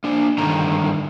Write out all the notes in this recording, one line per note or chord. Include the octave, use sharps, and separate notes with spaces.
A#3 D4
G2 D3 D#3 A#5